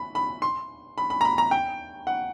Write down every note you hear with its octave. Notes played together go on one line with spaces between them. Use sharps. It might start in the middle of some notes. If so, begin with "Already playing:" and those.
Already playing: B5
B5
C6
B5
B5
A#5
B5
A#5
G5
F#5